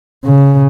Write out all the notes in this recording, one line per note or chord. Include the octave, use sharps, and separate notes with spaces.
C#3